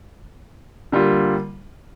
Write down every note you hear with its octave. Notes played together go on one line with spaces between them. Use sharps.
D3 G3 A#3 F4